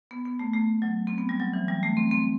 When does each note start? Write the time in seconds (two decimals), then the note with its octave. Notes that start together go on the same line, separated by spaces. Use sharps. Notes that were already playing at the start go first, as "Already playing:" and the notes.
0.11 B3
0.25 B3
0.39 A3
0.54 A3
0.82 F#3
1.07 C4
1.18 B3
1.29 G3
1.40 F#3
1.54 E3
1.68 G3
1.83 A3
1.97 C4
2.11 C4